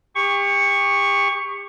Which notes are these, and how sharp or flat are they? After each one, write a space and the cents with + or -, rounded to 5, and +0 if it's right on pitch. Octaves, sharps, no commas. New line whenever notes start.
G4 +35 C#6 +0